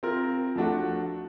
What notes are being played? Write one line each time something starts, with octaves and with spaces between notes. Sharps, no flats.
C4 F4 A#4
F3 A3 D4 F#4